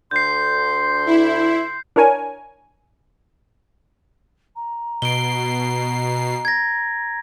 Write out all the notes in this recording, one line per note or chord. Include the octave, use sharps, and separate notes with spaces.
D2 D3 C6 G6 C7
E4
D4 E4 A#4 C#5 G#5
A#5
B2 C7 D7 G7
G#6 A#6